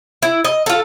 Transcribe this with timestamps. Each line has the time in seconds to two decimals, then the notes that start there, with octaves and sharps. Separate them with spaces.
0.22 E4
0.44 D#5
0.66 F4 A4